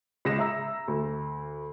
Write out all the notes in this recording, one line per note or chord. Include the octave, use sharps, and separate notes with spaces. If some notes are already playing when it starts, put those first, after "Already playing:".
C#2 G#3 A#6 E7
E5 A#5 E6
D2